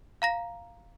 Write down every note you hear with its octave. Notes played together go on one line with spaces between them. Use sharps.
F5 A#5 A#6